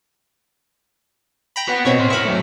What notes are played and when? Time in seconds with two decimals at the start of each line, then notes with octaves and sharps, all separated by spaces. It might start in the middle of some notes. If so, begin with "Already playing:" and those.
1.56 G5 A#5 B5
1.69 B4 F#5
1.85 B2 C4 C#5 C#6
1.99 A#4 C6
2.10 E4 A#4 B5 C#6
2.25 F#3 A3